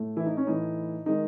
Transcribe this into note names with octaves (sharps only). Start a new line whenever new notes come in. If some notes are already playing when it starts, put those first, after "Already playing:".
Already playing: A2 A3
E3 E4
D#4
C#4
A2 E3 A3 D#4
D#3 G#3 D#4